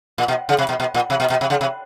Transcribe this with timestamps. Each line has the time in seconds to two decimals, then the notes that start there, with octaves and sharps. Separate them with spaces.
0.18 A#2
0.28 B2
0.49 C#3
0.59 C3
0.69 B2
0.80 B2
0.94 A#2
1.10 C3
1.20 B2
1.30 B2
1.41 C3
1.50 C#3
1.61 C3